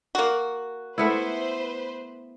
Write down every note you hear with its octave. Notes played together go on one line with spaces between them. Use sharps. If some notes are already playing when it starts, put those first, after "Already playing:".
A#3 F#4
A3 B3 E4 B4 C5